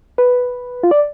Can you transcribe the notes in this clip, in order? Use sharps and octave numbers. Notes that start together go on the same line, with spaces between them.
B4
F4
D5